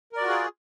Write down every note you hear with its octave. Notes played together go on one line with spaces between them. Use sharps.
F4 F#4 G#4 A#4 D5